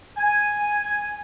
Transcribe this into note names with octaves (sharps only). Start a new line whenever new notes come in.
G#5